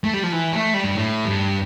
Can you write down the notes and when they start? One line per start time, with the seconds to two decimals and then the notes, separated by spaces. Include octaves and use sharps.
0.04 A3
0.14 G3
0.23 F3
0.32 E3
0.53 A3
0.74 G3
0.85 G2
0.94 A2
1.25 G2